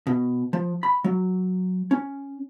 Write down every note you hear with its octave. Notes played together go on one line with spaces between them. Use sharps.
B2
F3
B5
F#3
C#4